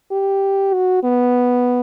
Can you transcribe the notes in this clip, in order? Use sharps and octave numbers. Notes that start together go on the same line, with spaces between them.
G4
F#4
B3